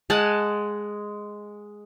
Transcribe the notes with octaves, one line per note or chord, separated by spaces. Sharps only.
G#3 F#5 G#5 A5